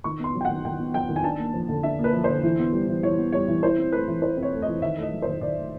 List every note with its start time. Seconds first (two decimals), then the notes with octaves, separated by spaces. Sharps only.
0.04 D#3 C#6
0.19 B3 C6
0.35 F#3
0.41 G5
0.45 D#3 F#5
0.65 D#3 G5
0.79 B3
0.94 F#3 G5
1.09 D#3
1.16 G#5
1.24 D4 A5
1.38 A#3
1.54 F3
1.69 D3
1.83 D4 E5
1.99 A#3
2.04 B4
2.13 F3
2.24 C5
2.29 D3
2.43 E3
2.59 B3
2.73 G3
2.88 E3
3.03 E3 C#5
3.18 B3
3.32 G3 C#5
3.48 E3
3.63 E4 C5
3.78 C4
3.92 A3 B4
4.08 E3
4.22 E4 C5
4.37 C4
4.43 C#5
4.53 A3
4.62 D#5
4.68 E3
4.82 D#3 E5
4.97 A3
5.03 D#5
5.12 F#3
5.22 D#3 C5
5.41 D#3 D5
5.57 A3